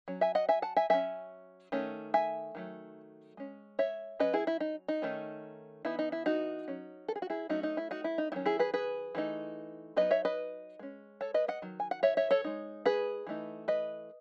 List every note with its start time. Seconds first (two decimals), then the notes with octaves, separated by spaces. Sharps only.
0.08 F#3 C#4
0.21 E5 G#5
0.35 D#5 F#5
0.49 E5 G#5
0.62 F#5 A5
0.76 E5 G#5
0.90 F#3 C#4 E5 G#5
1.72 D#3 A3 C#4
2.14 E5 G#5
2.55 D#3 F#3 A3
3.37 G#3 C#4
3.79 C#5 E5
4.20 F#3 C#4 B4 D#5
4.33 E4 G#4
4.47 E4
4.60 D#4
4.88 D#4
5.02 D#3 A3 C#4
5.85 E3 B3 D#4 E4
5.99 D#4
6.12 E4
6.26 D#4 F#4
6.68 F#3 C#4
7.08 A4
7.16 G#4
7.22 F#4
7.30 E4 G#4
7.49 F#3 A3 C#4 D#4 F#4
7.63 D#4
7.77 E4
7.91 D#4 F#4
8.04 E4
8.18 D#4
8.32 D#3 F#3 C#4 E4
8.46 E4 G#4
8.59 G#4 B4
8.74 G#4 B4
9.15 E3 A3 D#4
9.96 F#3 B3 D#4 B4 D#5
10.11 C#5 E5
10.25 B4 D#5
10.79 G#3 C#4
11.21 A4 C#5
11.34 B4 D#5
11.48 D#5 F#5
11.62 D#3 F#3
11.80 G#5
11.91 F#5
12.03 C#5 E5
12.17 C#5 E5
12.31 A4 C#5
12.44 G#3 D#4
12.85 G#4 B4
13.27 E3 A3 D#4
13.68 B4 D#5